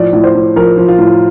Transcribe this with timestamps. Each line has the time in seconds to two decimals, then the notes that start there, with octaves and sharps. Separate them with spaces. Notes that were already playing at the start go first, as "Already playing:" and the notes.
Already playing: A2 F3 D5
0.13 A2
0.24 C5
0.35 A2
0.56 F3 A#4
0.78 F3
0.88 F4
0.99 A2